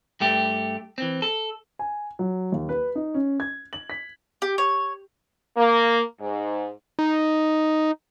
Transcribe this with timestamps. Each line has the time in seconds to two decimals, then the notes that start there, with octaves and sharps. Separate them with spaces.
0.20 G2 A3 G4
0.98 E3 C4
1.22 A4
1.79 G#5
2.19 F#3
2.52 D#2
2.69 B4
2.95 D#4
3.14 C#4
3.40 G#6
3.73 F#7
3.90 B6
4.42 G4
4.58 C#5
5.57 A#3
6.20 G#2
6.99 D#4